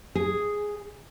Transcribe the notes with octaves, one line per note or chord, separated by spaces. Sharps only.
G#4